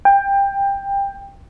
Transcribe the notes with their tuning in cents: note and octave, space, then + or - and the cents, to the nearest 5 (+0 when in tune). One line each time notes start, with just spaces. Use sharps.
G5 +20